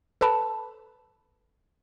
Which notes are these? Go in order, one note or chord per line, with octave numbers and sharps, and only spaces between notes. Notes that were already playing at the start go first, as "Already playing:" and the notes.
A4 B4 A5 B5